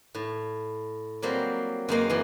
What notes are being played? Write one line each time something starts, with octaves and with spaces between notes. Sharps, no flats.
A2
F#3 G3 A#3 C4
F#2 G#3 A#3 D#5
F#2 E3